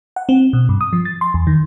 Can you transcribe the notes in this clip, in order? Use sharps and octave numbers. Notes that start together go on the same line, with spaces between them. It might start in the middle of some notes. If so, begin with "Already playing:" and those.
F#5
C4
B2
G2
D#6
F3
A6
C6
E2
D#3